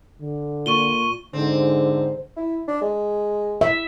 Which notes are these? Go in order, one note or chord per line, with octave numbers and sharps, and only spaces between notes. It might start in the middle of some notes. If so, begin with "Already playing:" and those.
D3
A#2 C#6 D#7 G7
G#2 D3 C4
E4
D4
G#3
E5